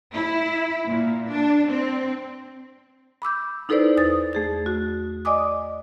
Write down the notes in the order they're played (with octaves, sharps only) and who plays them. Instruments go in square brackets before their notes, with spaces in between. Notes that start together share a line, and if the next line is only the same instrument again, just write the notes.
[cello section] E4
A#2
D4
C4
[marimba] B5 D6 E6 G6
D#4 E4 A4 B4 C5 D5
E2 D#6 A6
A3 G#4 A6
F#4
D5 D#5 G#5 D6 D#6